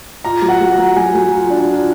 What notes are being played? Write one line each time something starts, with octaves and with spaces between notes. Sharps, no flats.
F4 A#5
F#3
F#5
F#3
A#5
F#3
F#3 G#5
F#3
F4
D4
F4